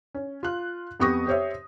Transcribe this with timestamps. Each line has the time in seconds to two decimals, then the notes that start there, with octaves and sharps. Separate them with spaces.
0.14 C#4
0.43 F4 F#6
1.00 F2 B3 G4 C#6 D#6 A#6
1.27 G4 C5 C#5 E5